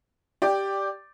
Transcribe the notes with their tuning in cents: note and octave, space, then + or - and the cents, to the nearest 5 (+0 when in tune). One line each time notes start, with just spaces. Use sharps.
G4 +0 D5 +0 G5 +10